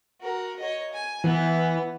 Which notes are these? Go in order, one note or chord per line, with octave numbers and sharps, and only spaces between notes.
F#4 A#4
C#5 D#5
G#5
E3 B3